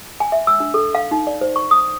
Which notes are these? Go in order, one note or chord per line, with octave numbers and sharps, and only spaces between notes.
G#5
E5
E6
D4
A4
F5
D#4
D5
C5
C#6
D#6